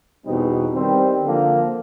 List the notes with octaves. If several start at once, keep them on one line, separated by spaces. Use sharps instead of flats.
E2 B2 G3 C4 D#4
D#3 G3 C4
D3 F3 A#3